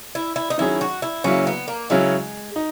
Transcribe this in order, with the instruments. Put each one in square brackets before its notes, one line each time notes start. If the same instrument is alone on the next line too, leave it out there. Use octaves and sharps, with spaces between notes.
[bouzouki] E4
E4
D#4
[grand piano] D#3 F#3 C#4 G#4 [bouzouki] E4
[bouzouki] F#4
E4
[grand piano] C#3 F#3 A#3 E4 [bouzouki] C#4
[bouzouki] B3
A#3
[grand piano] C#3 F#3 C#4 E4 [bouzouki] G#3
[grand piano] D#4